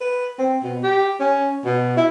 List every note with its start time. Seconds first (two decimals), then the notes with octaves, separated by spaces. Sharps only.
0.01 B4
0.39 C4
0.63 B2
0.83 G4
1.20 C#4
1.65 B2
1.97 E4